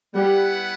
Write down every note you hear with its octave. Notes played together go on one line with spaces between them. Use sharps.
G3 B3 E4 B4 F#5